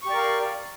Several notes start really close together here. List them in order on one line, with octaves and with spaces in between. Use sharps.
C#6 G4 D5 A#4 F5